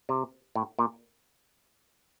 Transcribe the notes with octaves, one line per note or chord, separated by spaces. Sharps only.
C3
A2
A#2